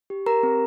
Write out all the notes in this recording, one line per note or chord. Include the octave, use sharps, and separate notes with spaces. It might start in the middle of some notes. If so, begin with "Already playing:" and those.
G4
G4 A#4 A#5
C4